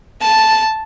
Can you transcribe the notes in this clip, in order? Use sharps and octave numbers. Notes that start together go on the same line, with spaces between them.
A5